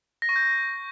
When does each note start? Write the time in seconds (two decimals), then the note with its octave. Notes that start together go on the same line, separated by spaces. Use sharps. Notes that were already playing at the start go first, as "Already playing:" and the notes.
0.22 A#6
0.29 C#6
0.36 G6